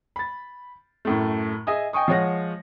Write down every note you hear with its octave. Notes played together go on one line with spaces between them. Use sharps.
B5 A6
F#2 A2 A3
G#4 D#5 E5 G#5 D#6
D#5 G5 G#5 C#6 D#6
F3 G#3 C#5 F#5 A#6